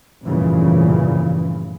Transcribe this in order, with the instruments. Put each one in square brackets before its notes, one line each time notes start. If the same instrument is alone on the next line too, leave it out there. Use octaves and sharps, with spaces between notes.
[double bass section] F1 A#1 G2 A#2 C#3 E3